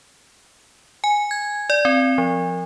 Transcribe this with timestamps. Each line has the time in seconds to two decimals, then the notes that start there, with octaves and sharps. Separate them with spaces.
1.04 G#5
1.31 G#6
1.70 D5
1.85 C4
2.18 F3